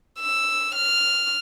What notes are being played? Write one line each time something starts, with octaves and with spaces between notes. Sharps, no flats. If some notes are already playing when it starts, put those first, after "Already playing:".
E6
F6